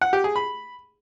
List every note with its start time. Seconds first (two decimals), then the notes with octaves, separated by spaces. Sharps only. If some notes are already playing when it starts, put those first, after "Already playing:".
0.01 F#5
0.13 G4
0.24 G#4
0.36 B5